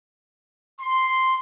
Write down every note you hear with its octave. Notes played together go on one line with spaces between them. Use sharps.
C6